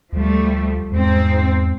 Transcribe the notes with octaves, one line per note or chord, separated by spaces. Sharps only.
D2 F3 G3 A3
E2 G#2 C4